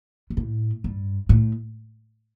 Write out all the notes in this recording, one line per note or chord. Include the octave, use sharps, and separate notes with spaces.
G2
A2
G2
A2